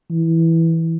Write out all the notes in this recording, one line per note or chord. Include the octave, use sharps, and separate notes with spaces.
E3